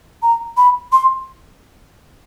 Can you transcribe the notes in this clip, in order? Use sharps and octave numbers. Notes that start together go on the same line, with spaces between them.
A#5
B5
C6